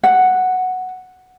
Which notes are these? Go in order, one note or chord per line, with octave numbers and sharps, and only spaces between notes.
F#5